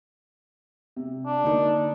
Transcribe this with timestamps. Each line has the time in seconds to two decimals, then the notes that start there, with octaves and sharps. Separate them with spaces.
0.96 C3
1.26 D4
1.44 D3 A#3 D#4